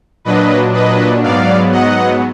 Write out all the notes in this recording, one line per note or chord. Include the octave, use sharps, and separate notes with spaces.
A#2 F#3 D4 B4 D#5
B4 D#5
G#2 F#3 B3 D5 F5
D#5 F#5